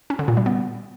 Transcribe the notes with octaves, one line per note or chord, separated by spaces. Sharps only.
C#4
D3
A#2
G3
B3